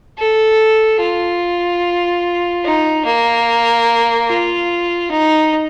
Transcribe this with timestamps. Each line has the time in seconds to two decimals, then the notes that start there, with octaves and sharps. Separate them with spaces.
0.19 A4
1.01 F4
2.65 D#4
3.06 A#3
4.29 F4
5.11 D#4